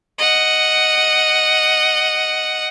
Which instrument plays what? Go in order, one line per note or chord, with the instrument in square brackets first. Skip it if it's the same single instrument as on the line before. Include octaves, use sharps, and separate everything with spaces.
[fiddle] D#5 F#5